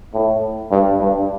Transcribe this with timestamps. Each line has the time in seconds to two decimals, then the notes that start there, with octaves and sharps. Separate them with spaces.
0.14 A2
0.71 G2
1.00 G2